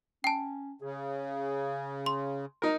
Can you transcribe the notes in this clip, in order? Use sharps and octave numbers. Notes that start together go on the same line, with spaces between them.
C#4 G5 A5
C#3 G#4
C6
D#4 A#4